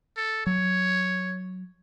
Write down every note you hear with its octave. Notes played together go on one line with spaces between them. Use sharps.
A4
F#3 C#5